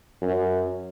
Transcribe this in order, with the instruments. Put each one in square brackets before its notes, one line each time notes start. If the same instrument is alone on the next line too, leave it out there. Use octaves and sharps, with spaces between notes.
[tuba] F#2